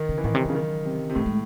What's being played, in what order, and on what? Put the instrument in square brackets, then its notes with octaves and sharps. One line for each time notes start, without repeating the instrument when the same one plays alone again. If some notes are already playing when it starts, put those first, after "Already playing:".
Already playing: [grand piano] D#3
[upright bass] C#3
[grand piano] E3
[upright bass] A2 [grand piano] D#3
[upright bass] C3
[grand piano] C#3 [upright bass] F#3
[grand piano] D#3
C3
C3
[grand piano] A2 [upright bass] G#3
[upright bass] G#3